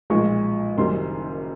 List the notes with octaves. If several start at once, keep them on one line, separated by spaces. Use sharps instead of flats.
B1 A#2 F3 G#3 C#6
F#1 F#2 D#3 G3 C6